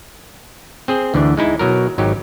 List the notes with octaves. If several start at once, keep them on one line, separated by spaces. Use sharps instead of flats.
C4 G#4 C5
D2 D3 E3 D4
G#3 D#4 E4
B2 F#3 A#4
G#1 F#3 D#4 G4